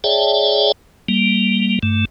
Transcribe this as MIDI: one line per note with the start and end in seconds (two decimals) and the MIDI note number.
0.04 0.72 68
0.04 0.72 73
0.04 0.72 74
0.04 0.72 76
0.04 0.72 79
0.04 0.72 81
1.08 1.79 55
1.08 1.79 58
1.83 2.05 43
1.83 2.05 57